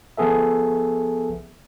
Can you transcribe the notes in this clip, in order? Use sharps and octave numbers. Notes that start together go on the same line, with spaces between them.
F3 B3 G#4 A4 E5